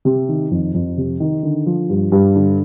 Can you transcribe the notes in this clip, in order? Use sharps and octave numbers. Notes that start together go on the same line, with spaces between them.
C3
D#3
F2
F2
C3
D#3
D3
F3
G2
G2
D3